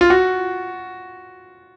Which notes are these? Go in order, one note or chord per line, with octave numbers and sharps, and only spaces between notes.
F4
F#4